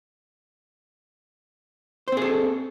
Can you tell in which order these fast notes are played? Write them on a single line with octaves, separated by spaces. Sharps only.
C5 C4 G#4 A4